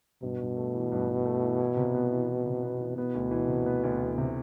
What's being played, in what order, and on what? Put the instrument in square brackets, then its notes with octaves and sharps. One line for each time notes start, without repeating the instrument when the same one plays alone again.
[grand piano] G2 [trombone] B2
[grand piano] G2
A3
E3
G2
G2
A3
E3
E4
C3
B3
E3
E4
C3
B3
E3
[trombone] B2 [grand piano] B3
[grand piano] D2
E3
C3
B3
D2
E3
C3